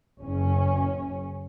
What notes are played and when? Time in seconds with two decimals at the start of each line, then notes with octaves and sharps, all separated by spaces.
0.20 F#1 C#4